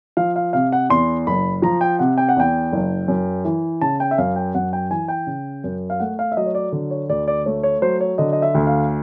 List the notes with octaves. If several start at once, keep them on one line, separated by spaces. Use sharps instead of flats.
F3 F5
F5
C3 F5
F#5
E2 C6
F#1 B5
F3 A#5
G5
C3 F#5
G5
F#5
E2 G5
F#1
F#2
E3
C#3 A5
G5
E5
F#2 F5
G5
F#2 F#5
G5
E3 G#5
G5
C#3
F#2
F5
A3 F#5
F5
E5
F#3 D#5
C#5
D5
D3
C#5
D2 D5
D5
A3 C#5
C#5
F#3 C5
C#5
D3 D#5
D#5
E5
D2
F5